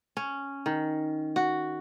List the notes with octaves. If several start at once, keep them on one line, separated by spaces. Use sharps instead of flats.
C#4
D#3
F#4